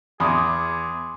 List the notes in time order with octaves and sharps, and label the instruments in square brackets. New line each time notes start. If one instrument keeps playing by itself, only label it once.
[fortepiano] E2 [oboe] G#4 [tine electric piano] G#5 C6 D6 [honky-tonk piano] B5 D#6